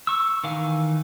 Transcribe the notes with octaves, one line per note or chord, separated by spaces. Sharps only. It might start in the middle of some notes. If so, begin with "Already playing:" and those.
C#6 E6
D#3 E3 F5 G#5